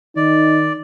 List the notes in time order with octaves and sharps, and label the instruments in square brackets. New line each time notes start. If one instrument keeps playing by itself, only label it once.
[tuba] D#3 [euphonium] D#4 [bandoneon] D5